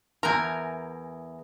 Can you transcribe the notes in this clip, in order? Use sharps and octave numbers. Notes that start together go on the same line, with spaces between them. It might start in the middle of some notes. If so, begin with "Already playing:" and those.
E2 A#4 G#5 A#5